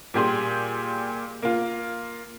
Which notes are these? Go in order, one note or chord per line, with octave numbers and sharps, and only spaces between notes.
A#2 G3 G4 G#4 G#5 C6
A#3 F4